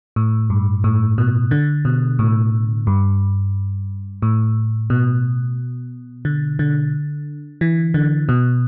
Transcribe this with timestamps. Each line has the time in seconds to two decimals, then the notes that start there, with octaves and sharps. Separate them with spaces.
0.16 A2
0.50 G2
0.84 A2
1.18 B2
1.51 D3
1.85 B2
2.19 A2
2.87 G2
4.22 A2
4.90 B2
6.25 D3
6.59 D3
7.61 E3
7.94 D3
8.29 B2